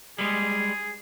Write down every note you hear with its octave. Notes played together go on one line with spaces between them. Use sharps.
G3 G#3 G#4